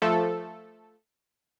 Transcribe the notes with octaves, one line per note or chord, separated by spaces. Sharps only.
F3 A3 A4